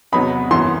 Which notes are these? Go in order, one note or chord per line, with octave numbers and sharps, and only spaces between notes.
E2 C3 F#3 B3 D#4 B5
G1 F#2 E3 C6